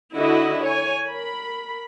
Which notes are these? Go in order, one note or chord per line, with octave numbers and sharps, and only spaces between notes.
D3 E4 F#4 D#5
C#5 G#5
A#4 B5